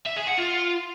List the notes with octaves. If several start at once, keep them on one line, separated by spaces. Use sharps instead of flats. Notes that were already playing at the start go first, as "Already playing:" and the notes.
E5
G#4
F#5
F4